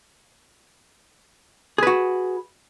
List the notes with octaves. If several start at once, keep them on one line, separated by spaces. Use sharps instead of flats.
F#4 G#4 B4